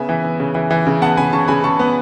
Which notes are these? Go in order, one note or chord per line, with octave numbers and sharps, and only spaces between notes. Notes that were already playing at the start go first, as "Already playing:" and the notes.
Already playing: C#3 B3 E5 G#5
E3
B3
C#3
E3
E3
C#3
B3 F#5 A5
C#3 G#5 B5
C#3 A5 C#6
C#3 G#5 B5
C#3 A5 C#6
B3